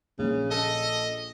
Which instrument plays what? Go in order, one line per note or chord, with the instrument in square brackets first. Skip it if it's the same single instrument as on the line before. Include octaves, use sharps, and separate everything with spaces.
[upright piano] A#1 [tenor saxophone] C#3
[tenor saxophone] A4 [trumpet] D#5